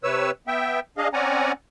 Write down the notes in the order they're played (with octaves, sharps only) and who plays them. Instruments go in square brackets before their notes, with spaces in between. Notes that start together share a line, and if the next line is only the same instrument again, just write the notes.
[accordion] C3 B4 C#5 E6
B3 E5 G5
D4 G#4 D#5 F5
C4 C#4 D5 F#5 G#5 A#5